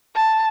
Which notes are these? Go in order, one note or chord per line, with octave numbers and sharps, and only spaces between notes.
A5